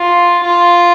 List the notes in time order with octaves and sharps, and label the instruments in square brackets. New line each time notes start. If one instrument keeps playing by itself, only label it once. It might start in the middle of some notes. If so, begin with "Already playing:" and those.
Already playing: [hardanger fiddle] F4
F4